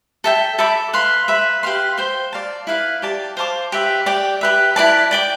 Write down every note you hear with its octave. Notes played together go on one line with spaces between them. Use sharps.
A4 E5 G5
A4 E5 B5 D6
B4 F5 C6
B4 E5 B5
G4 B4 F5 C6
C5 G5 C6
D5 F5 A5
E4 B4 F5
G4 D5 A5
C5 F5 A5 D6
G4 B4 E5
G4 D5 G5
G4 B4 E5
E4 B4 D5 A5
D5 G5 D6